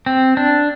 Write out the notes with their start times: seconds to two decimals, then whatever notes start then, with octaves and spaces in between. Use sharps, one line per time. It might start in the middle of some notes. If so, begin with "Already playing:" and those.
0.06 C4
0.37 D4